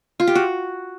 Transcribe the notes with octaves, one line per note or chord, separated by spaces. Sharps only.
F4
G4
F#4